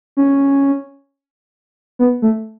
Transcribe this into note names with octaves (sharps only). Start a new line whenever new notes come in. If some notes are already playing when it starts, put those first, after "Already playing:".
C#4
B3
A3